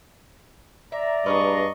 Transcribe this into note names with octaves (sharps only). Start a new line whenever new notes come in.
D5 E5 A#5
G2 G#4 A#4 B4 D#5 C#6